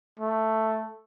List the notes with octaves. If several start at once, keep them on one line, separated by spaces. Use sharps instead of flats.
A3